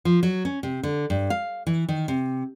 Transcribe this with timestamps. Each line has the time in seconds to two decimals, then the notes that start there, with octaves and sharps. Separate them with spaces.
0.05 F3
0.23 F#3
0.45 C#4
0.63 C3
0.83 D3
1.10 G2
1.30 F5
1.67 E3
1.89 D#3
2.08 C3